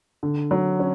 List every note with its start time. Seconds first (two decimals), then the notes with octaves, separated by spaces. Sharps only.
0.23 D3
0.51 F#3
0.80 C#4